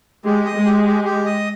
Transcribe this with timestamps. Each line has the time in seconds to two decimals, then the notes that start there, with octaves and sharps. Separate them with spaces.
0.25 G#3 G4
0.45 D#5
0.56 G#3
0.65 G4
0.85 G4
1.04 G4
1.25 D#5